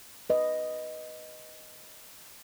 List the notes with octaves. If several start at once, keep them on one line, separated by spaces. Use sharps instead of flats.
B4 D#5